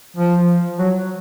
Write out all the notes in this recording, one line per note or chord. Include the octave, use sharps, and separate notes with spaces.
F3
F#3